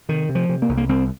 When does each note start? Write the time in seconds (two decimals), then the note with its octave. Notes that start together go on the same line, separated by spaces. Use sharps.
0.09 C3 D#3
0.29 C3
0.35 F3
0.49 C3
0.62 A#3
0.69 C2
0.77 A#3
0.89 C2 C4